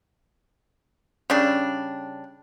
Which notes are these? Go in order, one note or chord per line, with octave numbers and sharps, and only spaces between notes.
C#3 G3 D4